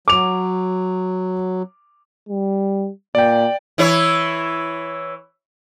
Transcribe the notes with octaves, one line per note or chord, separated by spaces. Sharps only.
F#3 D6 F7
G3
A#2 D5 G5
E3 E4 C#5